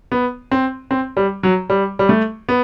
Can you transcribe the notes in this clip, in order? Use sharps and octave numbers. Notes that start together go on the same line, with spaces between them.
B3
C4
C4
G3
F#3
G3
G3
A3
B3